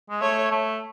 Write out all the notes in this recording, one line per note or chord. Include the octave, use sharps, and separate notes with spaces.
G#3
A3 C#5
A3